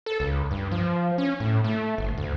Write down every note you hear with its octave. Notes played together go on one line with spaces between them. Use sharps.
A4
C#2
G2
F3
C#4
A2
A3
G1
D2